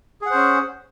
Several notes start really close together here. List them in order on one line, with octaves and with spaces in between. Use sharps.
G#4 F#5 C5 C#4